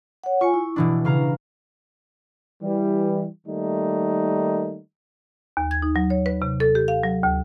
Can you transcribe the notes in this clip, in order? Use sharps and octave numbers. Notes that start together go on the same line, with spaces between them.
C#5 F#5
F4 G#5 C#6 C#7
E4
B2 E3 D4
C#3 F5 A#5
E3 G3
D#3 G3 A3 A#3 D#4
D#2
G#6
D#4
F#3
C#5
B4
C3
A4
G4
F5
F#3
D2